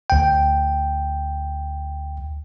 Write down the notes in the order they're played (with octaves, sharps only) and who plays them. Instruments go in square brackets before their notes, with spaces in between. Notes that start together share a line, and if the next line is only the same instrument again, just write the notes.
[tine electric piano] D2 G5